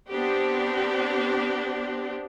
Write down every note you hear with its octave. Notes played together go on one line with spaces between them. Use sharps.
B3 C4 D4 G4